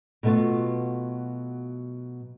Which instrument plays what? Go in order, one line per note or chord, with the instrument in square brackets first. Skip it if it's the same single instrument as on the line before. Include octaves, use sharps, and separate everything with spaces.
[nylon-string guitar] B2 F#3 A3 B3 F4